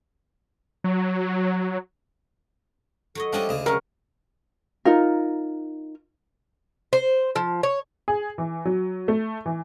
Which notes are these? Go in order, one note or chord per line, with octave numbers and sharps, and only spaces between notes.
F#3
F#3 A4 C#5 D#5
F3 G3 C#4 D4 E4 D#5
D2 C#3 G#4
F#3 G#3 C#4 A#4
D#4 F4 A#4
C5
F3
C#5
G#4
E3
F#3
A3
E3